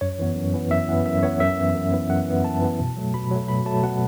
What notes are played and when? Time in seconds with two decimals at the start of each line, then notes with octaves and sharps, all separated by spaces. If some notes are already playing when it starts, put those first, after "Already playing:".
0.01 F#2 C#5
0.19 E3 B3
0.35 F#2
0.54 E3 B3
0.70 F#2 E5
0.88 E3 B3
1.05 F#2 E5
1.23 E3 B3 C#5
1.40 F#2 E5
1.57 E3 B3
1.75 F#2
1.92 E3 B3
2.10 F#2 F#5
2.27 E3 B3
2.44 F#2 A5
2.62 E3 B3
2.79 B2
2.97 F#3 A3
3.14 B2 B5
3.31 F#3 A3
3.48 B2 B5
3.66 F#3 A3 A5
3.83 B2 F#5